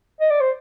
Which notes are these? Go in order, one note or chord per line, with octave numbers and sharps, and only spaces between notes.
D#5
D5
C5